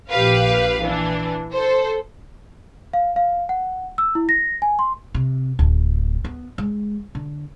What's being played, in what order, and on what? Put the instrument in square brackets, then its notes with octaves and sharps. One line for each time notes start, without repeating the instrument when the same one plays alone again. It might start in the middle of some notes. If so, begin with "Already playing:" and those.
[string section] A#1 G4 B4 F5
E3 D4
A4 C5
[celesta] F5
F5
F#5
E6
E4
A#6
G#5
C6
[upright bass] C3
D1
B3
G#3
D3